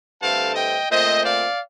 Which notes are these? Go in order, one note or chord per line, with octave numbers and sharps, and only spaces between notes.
G2 D3 A3 C4 F5 A5
D#5 G5
A#2 A3 C4 C5 D#5
D5 F5